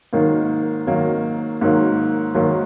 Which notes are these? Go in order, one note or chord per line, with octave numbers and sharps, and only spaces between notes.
G#2 D#3 F#3 A#3
G#2 D#3 F#3 A#3
G#2 D#3 F#3 A#3
G#2 D#3 F#3 A#3